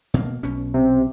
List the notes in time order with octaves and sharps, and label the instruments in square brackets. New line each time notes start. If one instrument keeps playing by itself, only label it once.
[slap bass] B2 A#3
B1 B2 C#4
[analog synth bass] C3